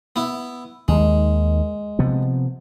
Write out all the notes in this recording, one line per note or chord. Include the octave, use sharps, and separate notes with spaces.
B3 E4
D#2 D#3 G#3
C3 F3 B3